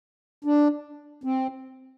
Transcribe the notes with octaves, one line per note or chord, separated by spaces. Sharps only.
D4
C4